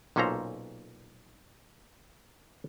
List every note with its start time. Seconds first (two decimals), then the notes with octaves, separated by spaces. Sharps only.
0.16 B1 A#2 C#4 A4 C5 A#5